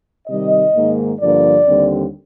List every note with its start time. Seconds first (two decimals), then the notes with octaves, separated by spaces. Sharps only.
0.28 C3 D#3 G3 D#5
0.74 G#2 D#3 A#3
1.21 G2 D3 F3 A#3 D5
1.67 D#2 D3 G3 C4